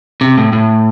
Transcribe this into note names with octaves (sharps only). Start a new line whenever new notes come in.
C3
A2
A2